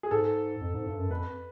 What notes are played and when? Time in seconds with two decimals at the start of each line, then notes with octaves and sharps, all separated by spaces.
0.03 G#4
0.11 G#2 A4
0.61 F2
0.74 G#2
0.86 G2
0.99 F#2
1.11 F2 B4